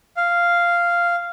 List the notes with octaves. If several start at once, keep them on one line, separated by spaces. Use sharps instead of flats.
F5